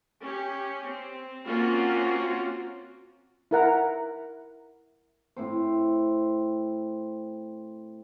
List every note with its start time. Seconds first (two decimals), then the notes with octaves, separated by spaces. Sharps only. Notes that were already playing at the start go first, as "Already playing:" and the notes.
0.22 C#4 G4
0.86 C4
1.47 A#3 C4 C#4 F4 F#4
3.51 E4 A#4 F#5
5.36 A2 C4 C5